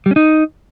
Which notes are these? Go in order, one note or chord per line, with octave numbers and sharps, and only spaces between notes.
G3
C#4
D#4